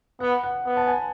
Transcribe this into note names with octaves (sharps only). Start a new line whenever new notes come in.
B3 F#5
F#5
B3
A5
G#5